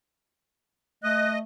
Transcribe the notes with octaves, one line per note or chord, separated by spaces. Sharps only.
A3 D#5 F#6